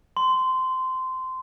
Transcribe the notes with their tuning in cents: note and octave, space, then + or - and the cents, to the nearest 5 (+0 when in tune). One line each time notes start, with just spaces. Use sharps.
C6 -15